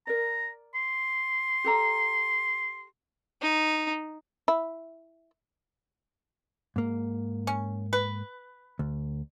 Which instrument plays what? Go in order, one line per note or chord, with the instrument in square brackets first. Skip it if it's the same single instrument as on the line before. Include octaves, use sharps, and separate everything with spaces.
[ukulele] A#4 D5 [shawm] A#5
[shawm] C6
[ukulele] G4 A4 A#5
[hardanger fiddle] D#4
[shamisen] E4
[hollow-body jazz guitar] G#2 A#3
[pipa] C#4
B4
[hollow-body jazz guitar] D2